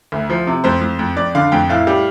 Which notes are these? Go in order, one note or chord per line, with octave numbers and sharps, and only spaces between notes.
D2
F3
C3
F2 C5
F2
F2
F2 D5
D3 F5
F2 G5
A2 F5
G3